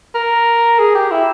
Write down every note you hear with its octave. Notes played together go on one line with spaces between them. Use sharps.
A#4
G#4
G4
E4